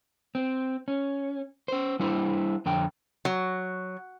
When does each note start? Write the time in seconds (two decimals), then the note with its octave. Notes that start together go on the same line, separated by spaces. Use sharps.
0.35 C4
0.88 C#4
1.68 C#4 C5
2.00 G3 D4 E4 C5
2.66 F2 D3 G5
3.25 F#3